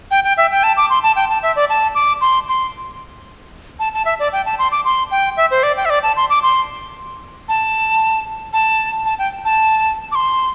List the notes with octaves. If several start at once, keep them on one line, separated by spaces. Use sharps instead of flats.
G5
G5
E5
G5
A5
D6
C6
A5
G5
A5
E5
D5
A5
D6
C6
C6
A5
A5
E5
D5
G5
A5
C6
D6
C6
G5
E5
C5
D5
G5
E5
D5
A5
C6
D6
C6
A5
A5
A5
G5
A5
D6
C6